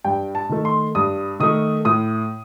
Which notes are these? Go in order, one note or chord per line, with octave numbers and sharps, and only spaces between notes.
G2 G5
A5
D#3 A3
C6
G2 D#6
D#3 A3 D#6
A2 D#6